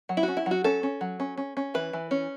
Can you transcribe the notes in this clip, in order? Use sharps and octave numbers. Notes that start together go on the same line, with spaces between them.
F#3
E4
F#4
C#4
E4
F#3 F#4
C#4 A4
C#4
F#3
C#4
C#4
C#4
E3 B4
E3
C#4